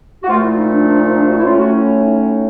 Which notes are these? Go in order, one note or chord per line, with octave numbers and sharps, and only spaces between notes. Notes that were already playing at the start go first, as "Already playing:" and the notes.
F#4
A#2 F3 A3 F4
E4
D#4
D4
D4
D#4
D4
F#4
E4
A2 F#3 A3 C#4 F4
F#4
E4
D#4